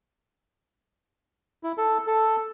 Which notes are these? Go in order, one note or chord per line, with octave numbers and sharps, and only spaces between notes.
E4
A4
A4